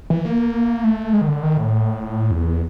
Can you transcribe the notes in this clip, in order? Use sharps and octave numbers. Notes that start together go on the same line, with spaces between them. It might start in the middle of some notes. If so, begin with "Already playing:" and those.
E3
A#3
A3
G#3
D#3
D3
D#3
A2
E2